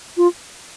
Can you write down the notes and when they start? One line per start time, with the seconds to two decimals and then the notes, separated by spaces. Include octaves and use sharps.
0.17 F4